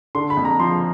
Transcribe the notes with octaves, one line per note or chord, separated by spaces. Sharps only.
D3 C6
B5
F2
A#5
F3 C6